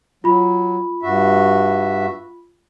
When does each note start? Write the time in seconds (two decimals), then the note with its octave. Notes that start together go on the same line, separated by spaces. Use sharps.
0.24 F#3 F4 B5
1.03 G2 F#4 E5